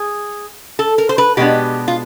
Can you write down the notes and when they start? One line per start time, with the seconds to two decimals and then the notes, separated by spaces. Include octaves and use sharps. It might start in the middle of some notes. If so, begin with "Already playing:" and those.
Already playing: G#4
0.79 A4
0.98 A#4
1.09 C5
1.18 B4
1.37 B2 G#3 B3 D4 G4
1.88 F4